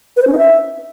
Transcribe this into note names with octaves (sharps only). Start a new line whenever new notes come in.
B4
C5
C#4
D#4
E5